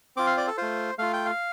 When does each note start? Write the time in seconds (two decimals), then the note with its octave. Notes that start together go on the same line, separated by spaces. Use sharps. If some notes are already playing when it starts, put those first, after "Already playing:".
0.17 C4 F4 D6
0.27 F5
0.37 D5
0.47 A4
0.57 A3 F4 C5
0.98 A3 F4 F5
1.13 G5
1.26 F5